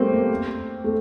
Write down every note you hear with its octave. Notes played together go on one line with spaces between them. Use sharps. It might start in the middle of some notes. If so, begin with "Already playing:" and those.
Already playing: G3 A3 A#3 C4
A3